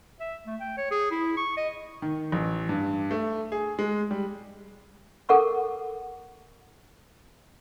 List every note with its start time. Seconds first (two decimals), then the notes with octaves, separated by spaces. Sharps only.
0.20 E5
0.46 A3
0.60 G5
0.77 C#5
0.91 G#4
1.11 E4
1.37 C#6
1.57 D#5
2.02 D#3
2.32 A1
2.69 G2
3.11 A3
3.52 G#4
3.79 G#3
4.11 G3
5.29 A4 A#4 F#5 C#6 D6